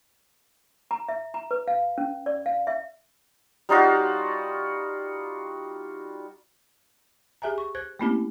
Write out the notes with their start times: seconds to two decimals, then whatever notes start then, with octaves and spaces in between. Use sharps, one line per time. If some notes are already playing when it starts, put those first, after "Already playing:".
0.91 A#5
1.09 E5
1.34 A#5
1.51 B4
1.68 F5
1.98 C#4
2.26 D5
2.46 F5
2.67 E5
3.69 G3 D#4 F4 F#4
7.42 G4 G#4 E5 G#5 A#5
7.58 C#6
7.75 C5 F#6 G#6
7.99 A3 A#3 C4 C#4 E4 G4